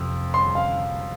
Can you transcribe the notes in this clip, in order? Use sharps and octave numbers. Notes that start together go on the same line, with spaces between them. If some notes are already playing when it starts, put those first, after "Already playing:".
Already playing: F2 C3
C6
F5